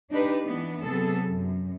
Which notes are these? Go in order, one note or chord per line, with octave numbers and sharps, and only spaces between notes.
D4 D#4 G4 B4
E3 B3 D4
C3 F#3 B3 G#4 A4
F#2